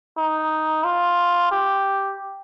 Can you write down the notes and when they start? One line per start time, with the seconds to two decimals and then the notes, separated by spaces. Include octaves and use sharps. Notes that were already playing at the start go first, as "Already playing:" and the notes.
0.17 D#4
0.84 F4
1.51 G4